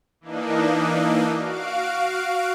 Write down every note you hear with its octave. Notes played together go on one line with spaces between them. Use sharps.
E3 A#3 D4 D#4
F#4 F5 D7